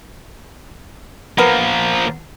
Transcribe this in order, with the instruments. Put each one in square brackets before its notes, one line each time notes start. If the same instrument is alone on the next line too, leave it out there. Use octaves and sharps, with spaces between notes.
[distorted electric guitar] F3 A#3 [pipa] B3 A#4